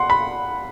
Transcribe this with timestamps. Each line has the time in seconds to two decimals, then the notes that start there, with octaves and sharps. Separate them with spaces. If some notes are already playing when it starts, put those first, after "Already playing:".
Already playing: F#5 C6
0.10 B5